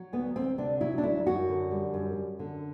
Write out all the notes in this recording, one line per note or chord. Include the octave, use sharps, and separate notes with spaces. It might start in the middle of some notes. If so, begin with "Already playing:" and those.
Already playing: F#3
D2 B3
D2 C4
C3 D4
F#3 E4
D4
D2 E4
F#2 F#4
D3
G3
F#2
F#2
D3